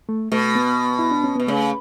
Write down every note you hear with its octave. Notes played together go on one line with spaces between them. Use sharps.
A3
B2 A3
B3
E4
D4
C#4
B2 B3
C#3 A3